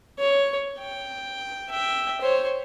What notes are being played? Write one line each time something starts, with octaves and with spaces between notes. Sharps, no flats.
C#5
G5
E5 G5
C5 C#5